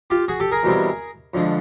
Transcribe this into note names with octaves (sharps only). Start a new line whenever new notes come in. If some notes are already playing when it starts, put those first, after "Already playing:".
F4 G4
F#4 G#4
G4 A4
G#4 A#4
E2 B2 G3 C4
F2 D3 F3 G#3